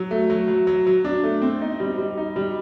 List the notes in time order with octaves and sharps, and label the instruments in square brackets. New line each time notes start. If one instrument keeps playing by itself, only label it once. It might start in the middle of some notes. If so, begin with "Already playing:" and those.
Already playing: [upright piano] F#3
A3
F#3
F#3
F#3
F#3
D4
A3
C4
D#4
G3
G3
D#4
G3